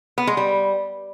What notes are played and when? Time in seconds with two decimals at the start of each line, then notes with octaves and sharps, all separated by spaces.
0.18 B3
0.27 G#3
0.37 G3